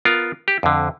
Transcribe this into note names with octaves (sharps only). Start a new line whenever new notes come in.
B3 F4 A#4
G4
F2 D3